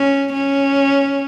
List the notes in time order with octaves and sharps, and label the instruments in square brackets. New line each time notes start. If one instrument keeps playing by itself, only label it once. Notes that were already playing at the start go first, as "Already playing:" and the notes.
Already playing: [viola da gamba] C#4
C#4